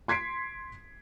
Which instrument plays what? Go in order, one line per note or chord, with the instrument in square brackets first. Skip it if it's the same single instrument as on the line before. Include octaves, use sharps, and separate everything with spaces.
[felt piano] C6 G#6 B6 C7 D7